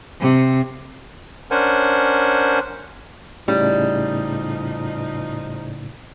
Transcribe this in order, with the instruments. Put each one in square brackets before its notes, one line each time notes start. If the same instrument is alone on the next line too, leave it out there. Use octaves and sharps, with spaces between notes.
[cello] C3
[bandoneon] C#4 D4 A#4 C5 F#5 G#5
[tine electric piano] A2 C#3 [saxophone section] F3 D#4 [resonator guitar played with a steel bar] G3